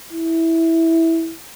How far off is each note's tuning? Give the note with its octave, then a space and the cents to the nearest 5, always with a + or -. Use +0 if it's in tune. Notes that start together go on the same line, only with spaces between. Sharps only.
E4 -10